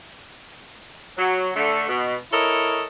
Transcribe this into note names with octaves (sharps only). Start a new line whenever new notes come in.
F#3
D3 A3
B2
E4 A4 A#4 C#5 D#5